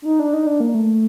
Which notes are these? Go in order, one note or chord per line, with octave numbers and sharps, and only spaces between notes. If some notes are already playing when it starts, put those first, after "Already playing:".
D4
D#4
D4
D#4
D4
A#3
A3